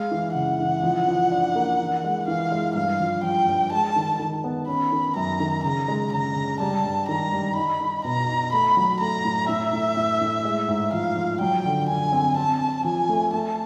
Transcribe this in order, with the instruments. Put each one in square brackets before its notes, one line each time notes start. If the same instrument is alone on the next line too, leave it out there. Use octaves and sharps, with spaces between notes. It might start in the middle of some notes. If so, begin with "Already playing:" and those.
Already playing: [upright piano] G#3 [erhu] F5
[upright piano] E3
[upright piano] C#3 [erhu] F#5
[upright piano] E3
F3
F3
D4
A#3
E3
G#3
[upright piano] E3 [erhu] F5
[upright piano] G#3
[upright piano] G2 [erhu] F5
[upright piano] F3
[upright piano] F3 [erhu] G5
[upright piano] G2
[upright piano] G#3 [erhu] A5
[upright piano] D#3
D#3
B3
[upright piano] C#4 [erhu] B5
[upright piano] D#3
[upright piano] F#2 [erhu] A#5
[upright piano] D#3
[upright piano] C#3 [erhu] A#5
[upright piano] G#3
[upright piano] C#3 [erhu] A#5
[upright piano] C#3
[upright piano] G3 [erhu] A5
[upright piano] G2
[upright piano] D#3 [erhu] A#5
[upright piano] G3
[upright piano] D#4 [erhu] B5
[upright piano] D#4
[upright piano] B2 [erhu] A#5
[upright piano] D#4
[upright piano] A3 [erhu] B5
[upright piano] F#3
[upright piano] A3 [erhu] A#5
[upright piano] A2
[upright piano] A2 [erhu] E5
[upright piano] A2
A2
A2
G#3
G#2
[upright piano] F3 [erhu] F5
[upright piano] F3
[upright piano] F#3 [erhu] G5
[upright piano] D3
[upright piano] D3 [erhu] G#5
[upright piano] C4
[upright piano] C4 [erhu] A5
[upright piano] C4
[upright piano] F3 [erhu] G#5
[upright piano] A3
[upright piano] A3 [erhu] A5